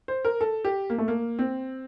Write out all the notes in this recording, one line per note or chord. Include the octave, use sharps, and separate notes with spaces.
C5
A#4
A4
G4
A#3
A3
A#3
C4